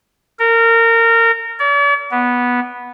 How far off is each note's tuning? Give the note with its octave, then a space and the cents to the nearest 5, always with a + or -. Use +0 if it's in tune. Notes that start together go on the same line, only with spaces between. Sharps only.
A#4 -25
D5 -45
B3 -10